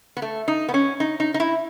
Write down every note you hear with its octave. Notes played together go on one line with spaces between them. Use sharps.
B3
A3
D#4
B3
C#4
D#4
D#4
D#4
E4